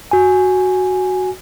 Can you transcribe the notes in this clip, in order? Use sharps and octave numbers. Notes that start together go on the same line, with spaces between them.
F#4 G#5